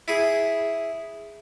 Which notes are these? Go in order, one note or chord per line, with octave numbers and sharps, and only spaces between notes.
E4 G#4